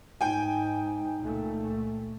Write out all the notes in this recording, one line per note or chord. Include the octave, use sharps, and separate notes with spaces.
G#2 D#4 G5 G#5
C#2 A#2 A3